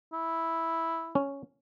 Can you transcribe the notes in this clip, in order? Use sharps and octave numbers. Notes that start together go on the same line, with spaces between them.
E4
C#4